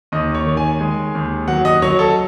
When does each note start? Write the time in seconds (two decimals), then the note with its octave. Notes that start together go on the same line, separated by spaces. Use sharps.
0.12 D#2 D#5
0.35 C#5
0.46 D#3
0.57 G#5
0.80 G#3
1.15 D#2
1.48 F#3 F#5
1.65 D#5
1.82 F#3 C#5
1.99 A4